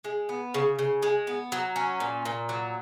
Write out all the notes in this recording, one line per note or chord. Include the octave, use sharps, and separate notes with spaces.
G#3
B3
C#3
C#3
G#3
B3
F#3
C#4
A#2
A#2
F#3